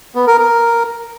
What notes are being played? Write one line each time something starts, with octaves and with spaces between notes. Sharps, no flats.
B3
A#4
A#4